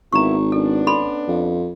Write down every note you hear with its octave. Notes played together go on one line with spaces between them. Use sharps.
G#1 A#3 B3 E4 A#5 C#6
B3 C#4 D4 A4
A4 B5 C6
F2